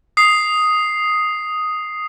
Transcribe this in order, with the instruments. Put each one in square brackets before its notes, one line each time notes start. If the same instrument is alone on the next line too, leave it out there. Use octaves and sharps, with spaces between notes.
[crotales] D#6 C7